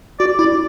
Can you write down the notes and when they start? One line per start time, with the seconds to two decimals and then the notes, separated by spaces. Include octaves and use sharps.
0.20 F#4 D5
0.39 E4 D5